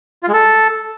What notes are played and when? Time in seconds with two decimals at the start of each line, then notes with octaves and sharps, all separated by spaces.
0.23 F4
0.28 G#3
0.33 A4